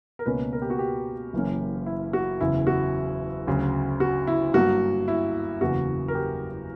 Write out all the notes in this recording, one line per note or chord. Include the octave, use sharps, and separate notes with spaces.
A#4
C#2 B2 A#3 C#4 B4
A#4
G4
F#4
G4
F#1 F#2 E3 A#3 C#4
E4
F#4
F#1 E2 C#3 E4
F#4
D2 C#3 F#3
F#4
E4
G2 F#3 A#3 F#4
E4
F#1 E2 C#3 E3 A#3 F#4
A#4
G4